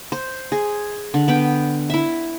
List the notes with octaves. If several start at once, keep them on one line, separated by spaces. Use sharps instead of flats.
C5
G#4
D3
B3 B4 G5
E4 E5